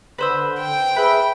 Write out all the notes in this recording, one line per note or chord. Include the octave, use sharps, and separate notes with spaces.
D3 B4 C5 E6
G5
G#4 B4 E5